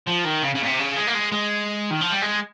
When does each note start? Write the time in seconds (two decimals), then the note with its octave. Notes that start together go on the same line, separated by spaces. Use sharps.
0.07 F3
0.25 D#3
0.42 C#3
0.55 C#3
0.63 A#2
0.66 C3
0.79 C#3
0.97 G#3
1.07 A#3
1.14 G#3
1.32 G#3
1.91 D#3
2.01 F3
2.11 G3
2.22 G#3